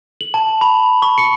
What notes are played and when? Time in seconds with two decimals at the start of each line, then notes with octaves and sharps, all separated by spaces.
0.21 F#7
0.34 A5
0.61 B5
1.02 C#6
1.18 C#7